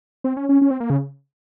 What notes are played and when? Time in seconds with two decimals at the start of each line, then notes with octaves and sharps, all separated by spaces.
0.24 C4
0.37 C#4
0.49 C#4
0.62 C#4
0.71 C4
0.80 A#3
0.90 C#3